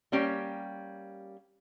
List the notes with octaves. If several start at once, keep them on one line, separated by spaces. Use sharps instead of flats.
G3 A#3 C#4 G4 G5